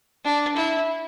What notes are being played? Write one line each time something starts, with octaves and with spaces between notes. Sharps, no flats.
D4
E4